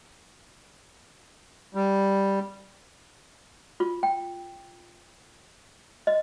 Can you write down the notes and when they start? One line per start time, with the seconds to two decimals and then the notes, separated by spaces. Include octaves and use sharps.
1.75 G3
3.80 F4
4.03 G5
6.07 D#5